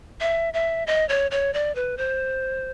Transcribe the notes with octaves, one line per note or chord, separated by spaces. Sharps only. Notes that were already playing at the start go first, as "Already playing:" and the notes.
E5
E5
D#5
C#5
C#5
D5
B4
C5